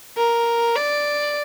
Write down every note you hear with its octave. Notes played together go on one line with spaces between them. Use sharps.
A#4
D5